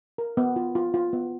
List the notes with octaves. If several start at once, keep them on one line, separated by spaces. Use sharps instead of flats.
A#4
B3
F4
F4
F4
B3